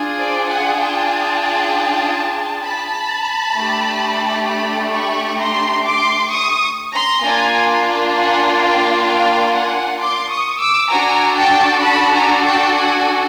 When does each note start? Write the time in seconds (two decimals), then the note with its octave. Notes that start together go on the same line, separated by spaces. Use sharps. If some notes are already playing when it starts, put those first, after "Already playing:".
Already playing: D4 F4 G#4
0.19 C5 D5
0.49 F#5 G#5
0.80 G5 A5
2.64 A5 B5
3.56 A3 D4 G4
4.47 A5 B5
4.93 B5 C#6
5.39 A#5 C6
5.85 C6 D6
6.31 C#6 D#6
6.93 A#5 C6
7.23 A#3 D4 F4 G#5 A#5
8.15 F#5 G#5
8.61 F5 G5
9.07 F5 G5
9.53 F#5 G#5
9.99 C6 D6
10.29 C#6 D#6
10.60 D6 E6
10.91 D4 F#4 A4 G#5 A#5
11.36 G5 A5
11.82 A5 B5
12.13 G#5 A#5
12.43 G5 A5
12.75 F#5 G#5